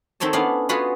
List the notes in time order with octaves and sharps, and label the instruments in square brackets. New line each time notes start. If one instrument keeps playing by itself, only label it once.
[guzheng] D#3 C4 A4 C#5 A5
B3 C#4 D4 E4 D5 F5
B3 F4 F#4 G#4 B4